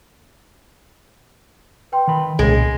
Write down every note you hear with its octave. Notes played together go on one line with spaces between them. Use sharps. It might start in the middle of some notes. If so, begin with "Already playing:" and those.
B4 G5 C6
D#3 B5
C2 A#2 C#3 G#3 G#4